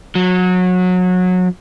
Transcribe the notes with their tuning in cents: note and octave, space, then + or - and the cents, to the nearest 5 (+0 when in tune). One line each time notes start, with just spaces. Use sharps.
F#3 -25